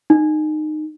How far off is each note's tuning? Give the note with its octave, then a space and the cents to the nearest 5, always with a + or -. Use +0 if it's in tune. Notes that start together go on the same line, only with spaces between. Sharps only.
D#4 -20